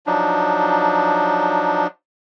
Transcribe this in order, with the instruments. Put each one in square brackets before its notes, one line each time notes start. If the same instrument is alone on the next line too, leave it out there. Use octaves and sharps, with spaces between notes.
[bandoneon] F3 F#3 D4 D#4